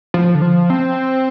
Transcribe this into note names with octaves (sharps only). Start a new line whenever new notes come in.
F3
D3
F3
C4